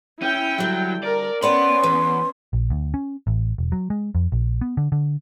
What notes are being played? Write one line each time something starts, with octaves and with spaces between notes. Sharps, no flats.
C#4 E4 G5
D3 F#3 G3
A#4 D5
B3 C#4 C#5 D5 F#5 G5 B5 C6
E2 B4
A#1
D2
C#4
A1
E1
F#3
G#3
F2
A#1
B3
D3
D3